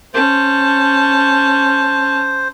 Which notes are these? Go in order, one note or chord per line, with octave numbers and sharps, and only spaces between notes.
C#4 C5 A5